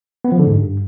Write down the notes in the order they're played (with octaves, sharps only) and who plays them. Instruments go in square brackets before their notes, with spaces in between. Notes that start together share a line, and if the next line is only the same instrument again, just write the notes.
[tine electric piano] B3
F3
D3
G#2
G2